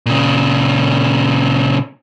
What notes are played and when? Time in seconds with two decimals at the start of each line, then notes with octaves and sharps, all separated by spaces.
0.06 A#2 C#3